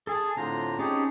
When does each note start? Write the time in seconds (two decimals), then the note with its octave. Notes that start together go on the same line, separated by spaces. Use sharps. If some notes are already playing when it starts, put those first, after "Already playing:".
0.07 G#4 A4 G#5 A5
0.37 A2 D3 C4 F4 C5 A#5
0.79 C4 C#4 D#4 G4 G#4 A5